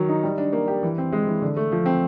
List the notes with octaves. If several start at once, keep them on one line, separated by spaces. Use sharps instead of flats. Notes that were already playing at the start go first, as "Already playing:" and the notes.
Already playing: D#3 F#3
D#4
G3
D4
A#3
G4
E3
C4
G#3
E3
D3
A3
F3
C4